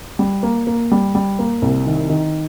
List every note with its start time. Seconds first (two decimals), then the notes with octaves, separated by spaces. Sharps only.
0.19 G3
0.43 A#3
0.67 A#3
0.91 G3
1.15 G3
1.39 A#3
1.62 C2
1.86 D#3
2.10 D#3